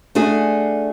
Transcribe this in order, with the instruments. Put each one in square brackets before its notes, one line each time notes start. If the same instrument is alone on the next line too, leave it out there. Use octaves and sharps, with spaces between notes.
[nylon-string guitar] A3 D4 F#4 G#4